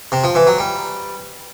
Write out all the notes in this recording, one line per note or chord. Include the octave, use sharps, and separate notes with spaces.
C3
F3
E3
F#3
G3